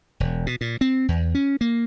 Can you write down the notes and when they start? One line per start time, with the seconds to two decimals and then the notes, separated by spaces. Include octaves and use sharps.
0.20 E1
0.47 B2
0.61 A#2
0.81 C4
1.08 E2
1.35 C#4
1.61 A#3